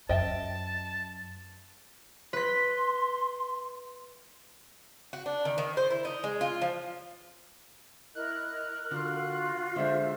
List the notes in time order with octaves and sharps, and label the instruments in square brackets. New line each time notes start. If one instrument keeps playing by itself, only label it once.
[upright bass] F#2 [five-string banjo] D#5 E5 G5 [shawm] A5
[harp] B4 B6 [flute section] C6
[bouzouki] F#4
D4
D#3
D#3
C5
E4
D#4
G#3
F4
F3
[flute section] E4 D#5 [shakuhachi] A#4 [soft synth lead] F#6
[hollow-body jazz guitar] D3 [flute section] F4 F#4
[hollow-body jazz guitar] D3 G#3 D4 [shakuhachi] C5 [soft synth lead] E5